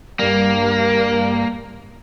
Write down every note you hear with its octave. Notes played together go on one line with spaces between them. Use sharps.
G2 G3 A#3 A#4